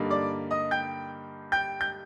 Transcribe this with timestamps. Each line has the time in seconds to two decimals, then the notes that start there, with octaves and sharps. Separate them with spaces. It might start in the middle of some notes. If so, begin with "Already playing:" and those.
Already playing: G2 D3 G3 A#3 D#4
0.10 D5 D6
0.51 D#5 D#6
0.71 G5 G6
1.52 G5 G6
1.81 G6